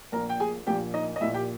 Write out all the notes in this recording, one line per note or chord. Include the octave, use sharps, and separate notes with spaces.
A#1 A#2 A#4 A#5
G5
G#4 G#5
A#1 A#2 G4 G5
D#4 D#5
D#5
A#1 A#2 E4 E5
G4 G5